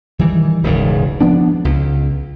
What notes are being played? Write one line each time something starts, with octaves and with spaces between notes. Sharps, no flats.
D#3 E3 G3
E1 C#2 G#2
F3 B3 D4
C#2